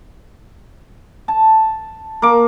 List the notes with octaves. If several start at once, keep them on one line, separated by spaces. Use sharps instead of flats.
A5
A#3 D6